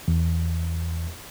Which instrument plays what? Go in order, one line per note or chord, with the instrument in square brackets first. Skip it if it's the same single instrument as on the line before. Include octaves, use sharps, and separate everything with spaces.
[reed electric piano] E2